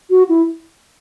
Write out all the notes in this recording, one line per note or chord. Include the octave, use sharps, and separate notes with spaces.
F#4
E4